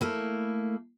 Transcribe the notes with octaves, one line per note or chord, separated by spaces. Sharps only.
A3 A#3 E4